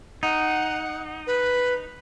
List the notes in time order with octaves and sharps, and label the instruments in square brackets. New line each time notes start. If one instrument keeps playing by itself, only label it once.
[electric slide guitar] D#4 [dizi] F#5
[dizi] B4